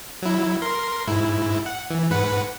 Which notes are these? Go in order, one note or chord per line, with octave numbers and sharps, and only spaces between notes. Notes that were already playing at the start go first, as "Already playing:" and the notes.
F#3 E4
A#4 C6
G#2 E4
F#5
E3
G#2 B4 F#5